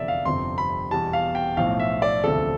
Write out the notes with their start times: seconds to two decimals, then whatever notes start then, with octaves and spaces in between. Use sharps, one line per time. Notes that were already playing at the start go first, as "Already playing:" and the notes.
Already playing: F1 E2 D3 F3 D5 E5
0.08 F5
0.25 G1 F2 C3 F3 C6
0.58 B5
0.91 E2 B2 G3 A5
1.13 F5
1.35 G5
1.57 B1 A2 F3 F5
1.79 E5
2.02 D5
2.24 E1 D2 C3 F3 A4